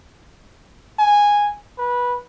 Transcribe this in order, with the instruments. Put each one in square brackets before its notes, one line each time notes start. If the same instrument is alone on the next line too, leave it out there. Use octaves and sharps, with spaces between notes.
[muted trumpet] G#5
B4